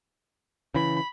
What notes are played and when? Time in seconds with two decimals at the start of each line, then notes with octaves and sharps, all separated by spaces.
0.74 C#3 E3 B5